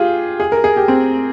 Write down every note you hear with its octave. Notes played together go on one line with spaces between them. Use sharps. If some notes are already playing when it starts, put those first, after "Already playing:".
Already playing: F4 G4 G#4
G#4
A#4
G#4
G4
C4